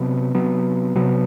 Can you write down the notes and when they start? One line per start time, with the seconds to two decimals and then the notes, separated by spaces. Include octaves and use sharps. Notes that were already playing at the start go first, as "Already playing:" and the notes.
Already playing: C3 F#3 B3
0.35 C3 F#3 B3
0.95 C3 F#3 B3